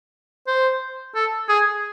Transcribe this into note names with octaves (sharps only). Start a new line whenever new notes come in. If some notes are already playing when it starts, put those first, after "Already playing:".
C5
A4
G#4